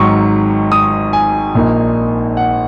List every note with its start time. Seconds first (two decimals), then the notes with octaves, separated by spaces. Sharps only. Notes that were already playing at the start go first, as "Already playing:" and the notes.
Already playing: G#1 G#2 F#3 C#6
0.72 D#6
1.13 G#5
1.55 A#1 A#2 A#3 D#4
2.37 F#5